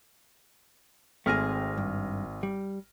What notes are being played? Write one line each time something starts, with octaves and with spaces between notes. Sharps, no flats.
G#1 A3 C4 G#4 F6 A#6
G2
G3